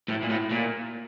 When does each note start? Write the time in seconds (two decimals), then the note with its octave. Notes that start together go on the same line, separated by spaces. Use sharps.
0.08 A2
0.23 A#2
0.30 A2
0.51 A#2